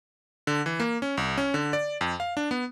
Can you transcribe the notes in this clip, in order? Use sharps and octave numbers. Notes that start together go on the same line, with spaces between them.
D3
E3
A#3
C#4
C2
C#4
D3
D5
F2
F5
D4
B3